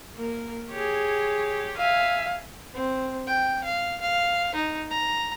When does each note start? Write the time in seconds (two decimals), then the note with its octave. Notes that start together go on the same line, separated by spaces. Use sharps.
0.15 A#3 A#4
0.71 G4 G#4 C#5
1.77 E5 F5 G#5
2.73 C4
3.27 G5
3.64 F5
4.01 F5
4.55 D#4
4.90 A#5